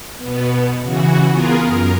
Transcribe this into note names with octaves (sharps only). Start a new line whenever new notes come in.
B2 B3
C#3 E3 F#4
B3 F4 G#4 A#4
F#2 A#4